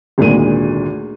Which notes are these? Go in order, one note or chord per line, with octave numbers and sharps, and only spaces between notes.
G#1 D2 A#2 G#3 D#7